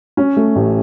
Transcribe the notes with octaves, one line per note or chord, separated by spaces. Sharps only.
C#4
A3
A1